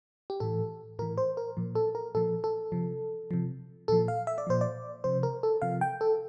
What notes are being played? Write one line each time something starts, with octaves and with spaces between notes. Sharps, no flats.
G4
A2 E3 A4
A2 E3 A#4
C5
A#4
A#2 F3
A4
A#4
A#2 F3 A4
A4
C3 F3
C3 F3
A#2 F3 A4
F5
E5
D5
A#2 F3 C5
D5
C3 F3 C5
A#4
A4
C3 F3 F5
G5
A4